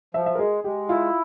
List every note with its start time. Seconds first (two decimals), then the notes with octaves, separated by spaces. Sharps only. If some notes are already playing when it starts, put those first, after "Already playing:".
0.14 F3 E5
0.26 E5
0.35 A#4
0.39 G#3 G#4
0.64 G#3 G4
0.89 E4 F4